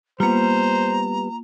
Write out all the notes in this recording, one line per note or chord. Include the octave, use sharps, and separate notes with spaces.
G3 A#3 B3 F4 C5 A#5